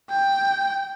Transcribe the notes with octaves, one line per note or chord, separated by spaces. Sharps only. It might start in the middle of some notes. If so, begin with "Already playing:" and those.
G5